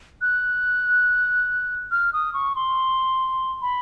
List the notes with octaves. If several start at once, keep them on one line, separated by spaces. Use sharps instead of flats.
F#6
F6
D#6
C#6
C6
B5